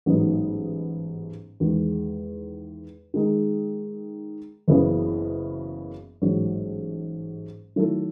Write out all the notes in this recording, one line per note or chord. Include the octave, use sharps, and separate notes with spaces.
A1 G#2 F#3 B3 D#4
E2 D#3 G#3
D#3 G#3 D#4
F#1 F#2 C#3 E3 B3
A1 G#2 F#3
D#3 F#3 A3 E4 A4